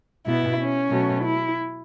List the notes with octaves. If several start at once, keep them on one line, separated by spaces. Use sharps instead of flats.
B2 B3 E4
C#4
B2 F#3 A3
E4